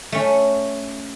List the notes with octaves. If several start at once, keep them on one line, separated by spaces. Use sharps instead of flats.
A3 C#4